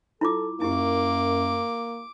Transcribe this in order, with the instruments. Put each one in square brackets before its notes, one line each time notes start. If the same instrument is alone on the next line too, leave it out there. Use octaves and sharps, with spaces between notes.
[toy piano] E4 F4 D6 [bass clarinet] A4
[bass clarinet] F#2 [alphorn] A#3 [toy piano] E4 G4 [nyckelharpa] D6